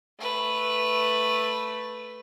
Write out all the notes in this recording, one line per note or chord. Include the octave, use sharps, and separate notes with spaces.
A3 B4